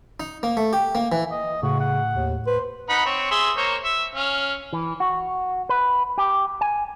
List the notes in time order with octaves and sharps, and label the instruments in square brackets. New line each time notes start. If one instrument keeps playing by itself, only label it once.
[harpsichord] D#4
A#3
A3
G4
A#3
E3
[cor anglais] D#5
[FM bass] A2 [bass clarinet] C#3 [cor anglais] F#4
[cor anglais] F#5
[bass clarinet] D#2
[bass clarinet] B4 [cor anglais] C5
[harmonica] D#4 F#5 B5
C4 C#5
G#4 E5 C6
A#3 C5 C#5
E5
C#4 F5
[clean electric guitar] E3
F#4
B4
G4
G#5